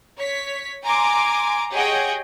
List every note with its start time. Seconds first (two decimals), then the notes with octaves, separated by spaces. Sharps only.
0.18 C#5 B6
0.82 G#5 A#5 C6 D6
1.71 G4 G#4 C#5 D#5 F#5 G5